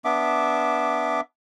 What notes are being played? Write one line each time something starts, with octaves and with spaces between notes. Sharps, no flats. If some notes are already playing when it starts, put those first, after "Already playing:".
B3 D4 E5 D6